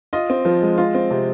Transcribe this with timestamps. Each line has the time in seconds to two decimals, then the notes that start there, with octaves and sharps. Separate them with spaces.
0.13 F4 D#5
0.30 C4
0.45 F3
0.62 G#3
0.78 F4
0.95 C4
1.11 C3